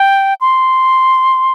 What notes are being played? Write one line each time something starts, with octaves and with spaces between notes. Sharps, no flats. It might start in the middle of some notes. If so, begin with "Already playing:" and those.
Already playing: G5
C6